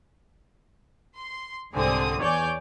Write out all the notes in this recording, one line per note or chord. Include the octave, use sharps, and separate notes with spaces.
C6
C2 G#2 D3 C4 G#5 D#6
E2 C#5 D5 G#5 D6 G6